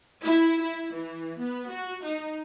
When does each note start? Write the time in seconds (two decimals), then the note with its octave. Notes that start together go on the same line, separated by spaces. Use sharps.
0.23 E4
0.61 E4
0.94 E3
1.39 B3
1.70 F#4
2.04 D#4